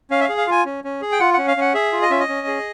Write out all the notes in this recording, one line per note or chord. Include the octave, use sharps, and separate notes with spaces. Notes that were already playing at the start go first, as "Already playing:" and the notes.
C#4 F5
E5
F5
G#4
F5
F4 G#5
C#4
C#4
G#4
G5
F4 F#5
C#4 F#5
F5
C#4 F#5
G#4 E5
F4
D#5
C#4 E5
D#5
C#4
G#4